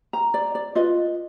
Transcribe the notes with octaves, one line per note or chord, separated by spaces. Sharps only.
A#5
D5
D5
F4 B4 D#5